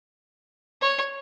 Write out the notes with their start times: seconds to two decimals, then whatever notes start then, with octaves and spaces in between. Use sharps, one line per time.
0.81 C#5